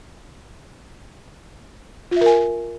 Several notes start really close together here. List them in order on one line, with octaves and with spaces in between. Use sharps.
F4 E5 A#4 G#5